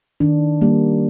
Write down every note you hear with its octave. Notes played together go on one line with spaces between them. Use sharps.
D#3 D4
G3 A#3